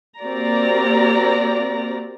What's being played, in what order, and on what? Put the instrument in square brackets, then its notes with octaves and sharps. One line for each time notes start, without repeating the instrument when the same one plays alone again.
[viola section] A#3 C4 F#4 G4 D5 A#5